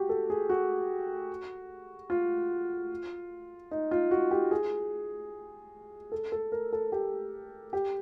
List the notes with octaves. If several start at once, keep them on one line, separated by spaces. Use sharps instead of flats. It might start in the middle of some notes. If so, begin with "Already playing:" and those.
Already playing: F#4 G4
A4
G#4
F#4
F4
D#4
F4
F#4
G4
G#4
A4
A4
A#4
A4
G4
G4